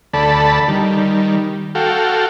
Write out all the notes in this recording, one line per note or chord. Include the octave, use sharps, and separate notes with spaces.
D2 A4 D5 A5 B5
D#3 G3
F#4 A4 F5 G5